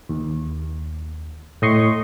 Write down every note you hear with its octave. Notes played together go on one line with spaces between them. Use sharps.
D#2
A2 D#5 C6 C#6